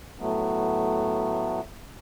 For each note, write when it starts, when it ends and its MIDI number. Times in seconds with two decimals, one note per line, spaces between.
0.19 1.61 45
0.19 1.61 54
0.19 1.61 57
0.19 1.61 59